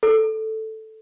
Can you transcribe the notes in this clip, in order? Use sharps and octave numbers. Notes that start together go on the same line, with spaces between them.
A4